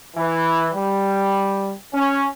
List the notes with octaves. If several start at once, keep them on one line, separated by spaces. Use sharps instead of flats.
E3
G3
C#4